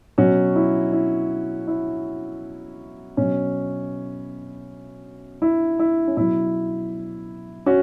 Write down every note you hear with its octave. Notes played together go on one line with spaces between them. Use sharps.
B2 F#3 C#4 F#4
E4
E4
E4
B2 F#3 C#4
E4
E4
C#4
B2 F#3 E4
C#4 F#4